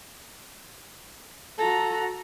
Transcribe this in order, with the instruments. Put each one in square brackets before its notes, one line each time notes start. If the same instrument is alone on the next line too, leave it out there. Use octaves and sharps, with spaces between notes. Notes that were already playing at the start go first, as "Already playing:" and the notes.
[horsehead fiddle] F#4 A#5 [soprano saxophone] A4